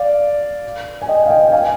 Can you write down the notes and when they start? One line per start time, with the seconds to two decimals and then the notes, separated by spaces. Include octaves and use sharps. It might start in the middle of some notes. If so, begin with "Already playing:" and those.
Already playing: D5 F5
1.02 G#5
1.08 D#5 G5
1.26 F5
1.30 D#5 G5
1.48 G5
1.52 F5 G#5